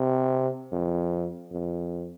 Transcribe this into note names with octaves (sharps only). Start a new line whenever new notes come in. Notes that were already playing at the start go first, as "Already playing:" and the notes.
Already playing: C3
F2
F2